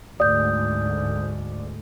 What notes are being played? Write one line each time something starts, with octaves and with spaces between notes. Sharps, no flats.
D2 G#2 D5 D#6 G6